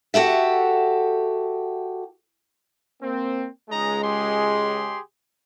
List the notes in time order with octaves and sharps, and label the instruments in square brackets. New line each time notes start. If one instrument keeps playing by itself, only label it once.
[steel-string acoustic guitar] F#4 G4 A4 E5
[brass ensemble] A#3 C4
[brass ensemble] C#2 G#3 [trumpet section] D#4 D#5 A#5
[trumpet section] G4 G#4 C6